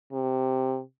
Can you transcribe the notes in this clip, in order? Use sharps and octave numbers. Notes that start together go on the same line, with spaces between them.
C3